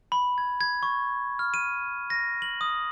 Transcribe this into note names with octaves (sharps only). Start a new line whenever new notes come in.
B5
G#6
G#6
C#6
F6
D#7
A#6
F#7
D#6